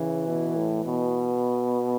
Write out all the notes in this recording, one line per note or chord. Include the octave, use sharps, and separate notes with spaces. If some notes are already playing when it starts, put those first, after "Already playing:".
Already playing: C#3 E3
B2
A2
B2